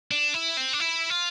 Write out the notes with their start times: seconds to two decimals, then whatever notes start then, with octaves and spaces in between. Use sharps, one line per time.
0.11 D4
0.34 E4
0.57 C4
0.73 D4
0.80 E4
1.10 F4